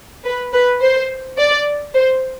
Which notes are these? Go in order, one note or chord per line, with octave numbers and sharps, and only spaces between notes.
B4
B4
C5
D5
C5